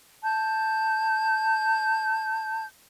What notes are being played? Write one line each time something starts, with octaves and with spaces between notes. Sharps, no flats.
A5 G6